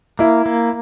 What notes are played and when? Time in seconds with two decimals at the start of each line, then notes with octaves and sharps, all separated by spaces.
0.19 A#3 E4
0.46 A#3